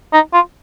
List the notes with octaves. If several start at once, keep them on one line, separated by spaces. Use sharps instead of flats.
D#4
F4